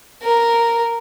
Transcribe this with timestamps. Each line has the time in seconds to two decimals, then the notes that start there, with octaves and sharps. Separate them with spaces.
0.23 A#4